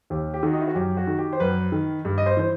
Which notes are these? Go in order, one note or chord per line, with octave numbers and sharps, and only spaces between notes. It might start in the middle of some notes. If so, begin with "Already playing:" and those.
D#2 G4
G4
D#3 F#4
D#4
E4
F#4
F#2 G4
F#4
D#3
G4
C5
F#2 B4
D#3
G2
D#5
C5
E3 C5